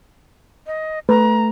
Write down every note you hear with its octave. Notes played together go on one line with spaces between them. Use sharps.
D#5
A3 B4 A#5